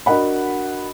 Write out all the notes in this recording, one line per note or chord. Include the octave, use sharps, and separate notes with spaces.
D4 F#4 A#4 D#5 F#5 B5